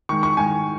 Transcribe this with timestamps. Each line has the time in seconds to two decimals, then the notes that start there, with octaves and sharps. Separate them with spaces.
0.09 D#3 G#3 C#6
0.23 C#6
0.37 D#3 G#3 G#5